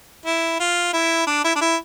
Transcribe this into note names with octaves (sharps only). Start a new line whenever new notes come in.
E4
F4
E4
D4
E4
D4
E4